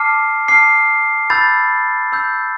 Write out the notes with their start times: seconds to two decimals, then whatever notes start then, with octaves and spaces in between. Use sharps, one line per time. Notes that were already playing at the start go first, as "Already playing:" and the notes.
Already playing: A5 D6 F6 C7
0.48 A5 D6 F6 C7
1.30 B5 E6 G6 A6
2.12 B5 E6 G6